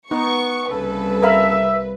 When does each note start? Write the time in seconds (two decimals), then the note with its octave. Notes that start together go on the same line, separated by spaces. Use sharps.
0.11 B3 D#4 C#6
0.71 C2 C#3 A#3 A4 B4
1.23 A#4 E5 F5 B5